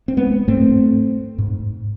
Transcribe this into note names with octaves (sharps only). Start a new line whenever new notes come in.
C4
G#3 B3
G#2 A3 C4
G#2